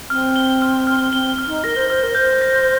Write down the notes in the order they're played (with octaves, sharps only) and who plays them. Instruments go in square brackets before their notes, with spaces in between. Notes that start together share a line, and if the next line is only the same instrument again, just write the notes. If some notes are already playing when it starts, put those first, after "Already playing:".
[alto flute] C4 [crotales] F6
[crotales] G7
F6
F6
[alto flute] C4 [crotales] G7
[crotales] F6
[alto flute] D#4
[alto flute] A#4 [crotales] A#6
[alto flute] C5
[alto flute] C5 [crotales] F6
[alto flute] A#4
[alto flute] C5 [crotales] G6
[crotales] A#6